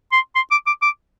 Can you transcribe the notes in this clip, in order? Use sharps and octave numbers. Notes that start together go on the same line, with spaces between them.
C6
C6
D6
D6
D6